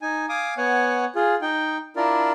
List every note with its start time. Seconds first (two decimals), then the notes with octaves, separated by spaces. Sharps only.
0.02 D#4 G#5
0.29 F5 G#5 D6 D#6
0.57 B3 C#5 F#5 G#5
1.15 F4 G#4
1.42 D#4 G5
1.96 D4 E4 F4 A#4 D5